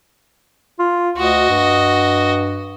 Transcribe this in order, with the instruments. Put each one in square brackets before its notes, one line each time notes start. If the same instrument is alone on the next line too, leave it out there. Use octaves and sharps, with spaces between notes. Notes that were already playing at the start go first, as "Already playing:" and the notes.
[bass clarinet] F4
[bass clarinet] D2 [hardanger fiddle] F#4 D#5
[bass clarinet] G2